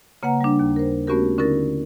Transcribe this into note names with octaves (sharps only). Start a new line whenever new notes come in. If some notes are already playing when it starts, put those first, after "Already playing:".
C#3 A#3 B4 F#5 A#5
G3 D4
D#2
A#4 C5
A3 B3 C#4 F#4 G4 A#4
D3 C#4 D#4 E4 A#4 A6